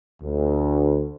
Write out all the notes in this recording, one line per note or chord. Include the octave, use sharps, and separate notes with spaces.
D2